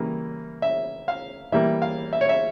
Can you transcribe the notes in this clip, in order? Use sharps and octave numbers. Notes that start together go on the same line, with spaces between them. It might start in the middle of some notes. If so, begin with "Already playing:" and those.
Already playing: C#3 E3 G3 A#3
E5
F5
E3 G3 A#3 E5
F5
E5
C#5
E5